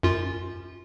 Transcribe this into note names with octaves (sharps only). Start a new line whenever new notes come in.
F#2 F4